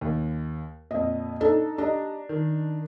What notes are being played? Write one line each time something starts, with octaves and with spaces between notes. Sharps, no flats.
D#2
F2 A#2 D#5
D4 D#4 A4
D4 G4 D#5 A#5
D#3